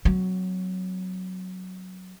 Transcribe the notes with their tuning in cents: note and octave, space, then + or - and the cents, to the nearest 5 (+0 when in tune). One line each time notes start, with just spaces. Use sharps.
F#3 +0 C4 -25